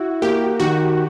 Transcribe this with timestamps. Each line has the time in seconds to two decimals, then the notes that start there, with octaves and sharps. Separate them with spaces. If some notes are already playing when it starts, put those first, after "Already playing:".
Already playing: E4 F#4
0.22 A#3 G4
0.60 D#3 F#4